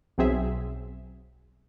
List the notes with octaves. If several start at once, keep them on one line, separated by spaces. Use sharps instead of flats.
B1 F#3 C4 G#4 E5